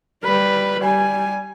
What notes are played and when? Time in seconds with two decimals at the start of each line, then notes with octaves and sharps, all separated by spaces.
0.24 G3 B4
0.81 G3 G#5